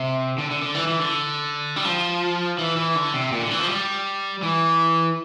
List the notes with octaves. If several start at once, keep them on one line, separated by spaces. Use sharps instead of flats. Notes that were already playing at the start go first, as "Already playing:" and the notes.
Already playing: C3
D3
D3
D3
E3
E3
D3
G3
F3
E3
E3
D3
C3
A#2
D3
E3
F3
G3
E3